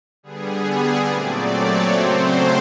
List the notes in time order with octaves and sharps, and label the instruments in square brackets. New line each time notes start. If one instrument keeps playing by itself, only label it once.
[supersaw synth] D3 G3 B3 G#4
A#2 F#3 A3 C4 D5
C#5
C#3 F#3 A3 C4 C5